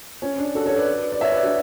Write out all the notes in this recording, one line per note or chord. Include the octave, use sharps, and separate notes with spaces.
C#4
D4
F#4 A4
A4 C#5
B4 D5
D5
C#5 E5
B4 D5
D4 F#4